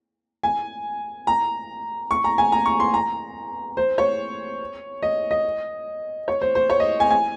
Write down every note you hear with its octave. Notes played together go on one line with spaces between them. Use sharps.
G#5
A#5
C#6
A#5
G#5
A#5
C#6
C6
A#5
C5
C#5
D#5
D#5
C#5
C5
C5
C#5
D#5
G#5
G#5